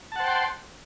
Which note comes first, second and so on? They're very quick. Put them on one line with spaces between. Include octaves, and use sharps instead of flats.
A5 F#5 C5 G5 C6